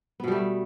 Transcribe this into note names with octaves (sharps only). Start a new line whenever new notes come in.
B2 G3 A3 B3